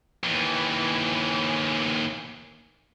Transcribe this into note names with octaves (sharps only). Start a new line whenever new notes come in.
D#2 E3